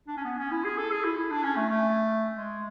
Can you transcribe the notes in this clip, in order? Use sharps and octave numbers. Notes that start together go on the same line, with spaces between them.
D4
C#4
B3
C#4
E4
G#4
A4
G#4
E4
E4
D4
C#4
A3
A3
G#3